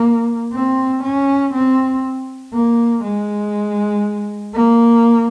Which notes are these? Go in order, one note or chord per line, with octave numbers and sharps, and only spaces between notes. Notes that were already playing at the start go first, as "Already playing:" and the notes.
Already playing: A#3
C4
C#4
C4
A#3
G#3
A#3